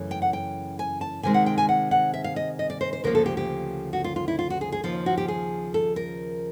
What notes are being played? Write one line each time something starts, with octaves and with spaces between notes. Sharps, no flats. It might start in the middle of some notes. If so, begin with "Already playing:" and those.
Already playing: F#2 C#3 E3 A3 C#4
G5
F#5
G5
G#5
A5
C3 D#3 G#3 C4 G#5
F#5
G5
G#5
F#5
F#5
E5
F5
D#5
D#5
D5
C5
C5
D2 C#3 F3 A#3 A#4
A4
G4
G4
F#4
F4
F4
E4
F4
F#4
G#4
G#4
D#2 C#3 F3 F4
F#4
G4
G#4
A4
A#4